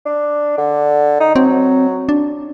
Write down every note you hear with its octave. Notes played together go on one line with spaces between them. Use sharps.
D4
D3
D#4
F#3 C4
D4